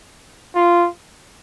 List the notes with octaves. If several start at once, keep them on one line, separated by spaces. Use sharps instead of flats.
F4